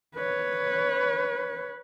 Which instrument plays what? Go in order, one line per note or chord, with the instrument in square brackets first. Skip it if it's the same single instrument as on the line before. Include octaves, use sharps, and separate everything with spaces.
[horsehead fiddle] B4 C#5